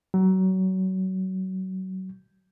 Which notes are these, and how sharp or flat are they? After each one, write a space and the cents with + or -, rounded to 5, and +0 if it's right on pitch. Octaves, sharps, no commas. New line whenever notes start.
F#3 +25